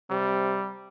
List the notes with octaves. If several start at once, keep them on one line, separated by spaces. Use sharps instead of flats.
C3 G3